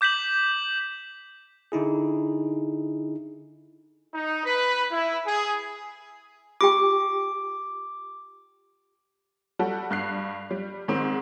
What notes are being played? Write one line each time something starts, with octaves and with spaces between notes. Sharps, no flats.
D6 G6 B6 E7 F#7
D3 D#4 E4 G#4
D#4
B4
E4
G#4
F4 G4 G5 D6
G3 F#4 A4
G2 F#6 C7
G3
G#2 D#3 G#3 C4